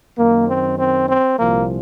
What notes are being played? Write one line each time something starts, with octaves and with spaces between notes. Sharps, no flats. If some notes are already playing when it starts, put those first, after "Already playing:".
F#2 D#3 A#3
C4
C4
C4
C2 A#2 F3 A#3